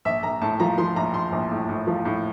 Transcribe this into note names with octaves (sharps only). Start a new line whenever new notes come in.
A#1 E5
A#1 A#5
A2 A5
F3 A#5
F3 C6
A#1 A#5
A#1 C6
A#1
A2
A2
F3
A2